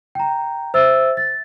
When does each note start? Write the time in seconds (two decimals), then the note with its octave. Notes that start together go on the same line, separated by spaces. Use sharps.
0.15 G5 A#5
0.74 C5 E5 E6 A6
1.17 A6